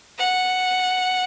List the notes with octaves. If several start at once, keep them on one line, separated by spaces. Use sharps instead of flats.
F#5